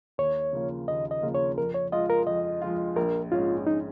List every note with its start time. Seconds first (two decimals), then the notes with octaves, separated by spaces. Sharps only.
0.18 D#2 C#5
0.53 C#3 F3 A#3 F4
0.88 D#2 D#5
1.11 D#5
1.22 C#3 F3 A#3 F4
1.34 C#5
1.58 F2 A#4
1.74 C#5
1.92 F3 G#3 F4 D#5
2.10 A#4
2.27 F2 D#5
2.61 F3 G#3 F4
2.96 A#1 A#4
3.32 G#2 G#3 C#4 F4
3.66 A#1 D#4